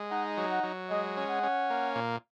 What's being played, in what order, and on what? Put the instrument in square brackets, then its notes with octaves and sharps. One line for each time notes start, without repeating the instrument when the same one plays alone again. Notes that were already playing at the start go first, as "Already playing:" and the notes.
Already playing: [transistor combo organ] G#3
[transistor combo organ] D#4 [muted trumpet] F#5
[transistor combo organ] F#3
[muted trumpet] F#5
[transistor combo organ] F#3
[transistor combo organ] G#3 [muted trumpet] D#5
[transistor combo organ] C#4
[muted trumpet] F#5
[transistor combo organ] C#4
A#3
A#2